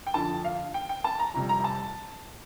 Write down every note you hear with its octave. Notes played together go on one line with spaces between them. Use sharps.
G5
F2 D3 F3 A5
F5
G5
G5
A5
A#5
F2 C3 G3 A#5
A#5
A#5
A5